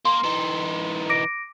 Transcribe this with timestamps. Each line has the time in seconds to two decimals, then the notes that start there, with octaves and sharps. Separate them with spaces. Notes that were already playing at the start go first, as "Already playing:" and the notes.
0.05 A#3 C6
0.24 E3 D#4
1.10 D6 A#6 D7